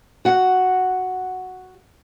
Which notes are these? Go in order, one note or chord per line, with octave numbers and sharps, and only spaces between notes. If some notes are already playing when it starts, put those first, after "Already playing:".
F#4 F#5